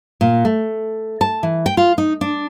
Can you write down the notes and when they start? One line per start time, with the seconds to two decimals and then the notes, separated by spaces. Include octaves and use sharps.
0.21 A#2
0.45 A3
1.21 A5
1.43 E3
1.66 G5
1.77 F4
1.98 D#4
2.21 D4